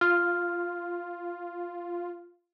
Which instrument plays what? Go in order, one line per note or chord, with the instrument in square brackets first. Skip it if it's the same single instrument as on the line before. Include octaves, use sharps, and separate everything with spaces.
[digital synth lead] F4 [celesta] F6